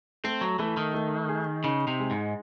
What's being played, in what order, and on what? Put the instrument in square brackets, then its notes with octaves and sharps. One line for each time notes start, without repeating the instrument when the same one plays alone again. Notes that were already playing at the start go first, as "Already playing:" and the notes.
[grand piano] A3 [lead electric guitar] C4
[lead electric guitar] F#3
[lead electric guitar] E3 [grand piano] A3
[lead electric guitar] D#3
[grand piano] A3
G#4
[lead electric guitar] C#3 [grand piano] D#4
[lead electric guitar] C3
[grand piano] G#3
[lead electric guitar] G#2